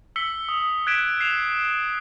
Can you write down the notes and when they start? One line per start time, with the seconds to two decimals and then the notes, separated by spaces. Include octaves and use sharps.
0.16 E6 B6 C#7 G7
0.49 D#6
0.87 F#6 G#6 B6 D7 E7
1.21 C7 E7 F7